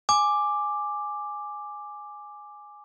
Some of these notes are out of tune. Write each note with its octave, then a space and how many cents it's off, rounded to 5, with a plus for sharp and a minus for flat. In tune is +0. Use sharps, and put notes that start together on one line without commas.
G#5 +0 D6 +5